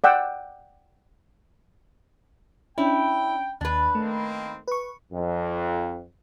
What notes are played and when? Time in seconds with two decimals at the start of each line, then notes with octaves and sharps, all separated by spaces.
0.04 D5 F#5 G5 E6
2.78 C#4 D4 E4 G5
3.61 D#2 D4 B4
3.95 D#3 A3 A#3 C4
4.68 B4 C#6
5.13 F2